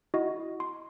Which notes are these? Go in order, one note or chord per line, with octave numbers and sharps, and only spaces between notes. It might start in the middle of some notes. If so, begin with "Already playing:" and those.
E4 F#4 D#5
C6